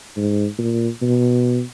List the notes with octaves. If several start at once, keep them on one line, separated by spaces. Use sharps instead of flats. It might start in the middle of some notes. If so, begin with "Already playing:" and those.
G#2
A#2
B2